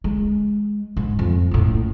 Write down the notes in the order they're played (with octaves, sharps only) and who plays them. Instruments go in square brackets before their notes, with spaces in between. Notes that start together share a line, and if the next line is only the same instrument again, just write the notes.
[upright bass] G#3
G#2
F2
F#1 A2